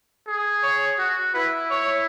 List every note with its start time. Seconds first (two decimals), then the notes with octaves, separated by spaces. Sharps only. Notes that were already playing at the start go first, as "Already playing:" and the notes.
0.27 G#4
0.63 C#5
0.99 F#4
1.34 E4 B4
1.70 C#5